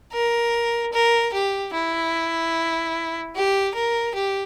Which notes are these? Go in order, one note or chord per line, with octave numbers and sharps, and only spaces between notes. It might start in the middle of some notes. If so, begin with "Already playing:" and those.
A#4
A#4
G4
E4
G4
A#4
G4